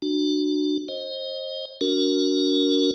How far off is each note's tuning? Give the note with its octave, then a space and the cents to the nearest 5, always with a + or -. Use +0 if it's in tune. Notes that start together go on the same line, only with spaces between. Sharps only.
D4 +25 F#4 +0
C5 +25 D#5 +0
D4 -35 F#4 +0 A#4 +0